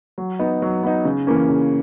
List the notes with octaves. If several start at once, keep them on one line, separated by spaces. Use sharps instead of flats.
F#3
B3 D#4
F#3
B3 D#4
C#3
E3 A#3 C#4
C#3